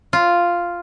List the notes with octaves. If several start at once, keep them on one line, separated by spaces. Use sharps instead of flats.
F4